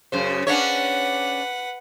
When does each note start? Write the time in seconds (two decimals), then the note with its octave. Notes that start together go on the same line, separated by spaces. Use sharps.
0.12 F#2 C#3 C5
0.47 C#4 D4 B4 C#5 F#5